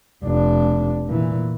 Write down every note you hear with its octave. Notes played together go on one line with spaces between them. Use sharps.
F1 D4
A#2 E3